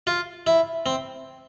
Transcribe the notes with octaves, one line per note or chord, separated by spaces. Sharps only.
F4
E4
C4